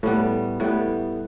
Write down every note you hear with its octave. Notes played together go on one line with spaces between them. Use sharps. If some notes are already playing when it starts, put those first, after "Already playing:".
A2 G3 B3
A2 G3 B3